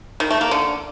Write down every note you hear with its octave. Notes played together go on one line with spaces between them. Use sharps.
D#3
A3
A#3
D3